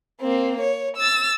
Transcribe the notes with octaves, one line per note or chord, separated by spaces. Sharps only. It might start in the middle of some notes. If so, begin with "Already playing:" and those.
A#3 C4
C#5
E6 A6